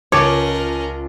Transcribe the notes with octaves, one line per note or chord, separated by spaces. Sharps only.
C#2 C#4 F4 A#4 C#5 A5 D6